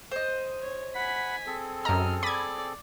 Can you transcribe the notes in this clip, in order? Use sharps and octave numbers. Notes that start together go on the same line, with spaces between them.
C5 D#5
C#5
F#5 G#5 B5 B6
C4 G#4 A4
F#2 D#5 A#5 F6
D5 B5 D#6 G#6